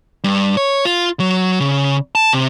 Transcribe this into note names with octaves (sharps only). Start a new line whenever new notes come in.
G2
C#5
F4
F#3
C#3
A5
C3